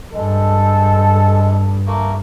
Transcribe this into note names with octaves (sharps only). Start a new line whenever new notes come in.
G2 G#3 A4
A3 A#3